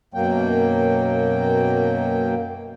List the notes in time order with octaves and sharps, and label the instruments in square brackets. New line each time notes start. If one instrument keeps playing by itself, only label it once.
[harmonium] F#2 B2 F#3 A#3 G5